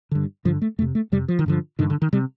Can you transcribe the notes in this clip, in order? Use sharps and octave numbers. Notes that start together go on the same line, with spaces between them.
G2 D3
G2 D3 F3
A3
F2 C3 A3
A3
F2 C3 G3
F3
D#3
G2 D3 F3
G2 D3 D#3
D3
D#3
C3 G3